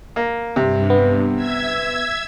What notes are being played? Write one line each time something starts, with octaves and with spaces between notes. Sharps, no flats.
A#3
G2 C3
B3
E5 E6 G#6